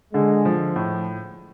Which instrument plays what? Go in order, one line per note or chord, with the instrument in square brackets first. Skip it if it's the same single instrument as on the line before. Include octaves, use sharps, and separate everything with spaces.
[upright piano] D3 [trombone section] G#3
[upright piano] F3
A2